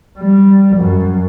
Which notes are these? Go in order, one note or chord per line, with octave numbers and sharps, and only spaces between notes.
G3
F#2